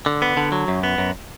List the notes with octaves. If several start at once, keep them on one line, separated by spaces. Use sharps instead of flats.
D3
B3
D3
F#3
F#2
B3
F#2